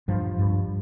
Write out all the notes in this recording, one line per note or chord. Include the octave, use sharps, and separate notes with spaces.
G2 F3
G2